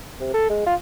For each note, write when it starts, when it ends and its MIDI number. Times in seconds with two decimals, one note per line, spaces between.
0.21 0.30 48
0.34 0.48 69
0.50 0.66 56
0.66 0.75 65